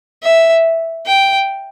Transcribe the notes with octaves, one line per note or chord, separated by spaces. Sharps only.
E5
G5